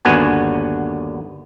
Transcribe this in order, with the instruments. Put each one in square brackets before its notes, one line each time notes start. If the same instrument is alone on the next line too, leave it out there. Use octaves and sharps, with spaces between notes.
[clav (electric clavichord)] G1 D#2 D3 B3 F#4 G#5